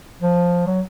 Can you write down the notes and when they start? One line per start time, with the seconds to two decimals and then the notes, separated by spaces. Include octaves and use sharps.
0.22 F3
0.67 F#3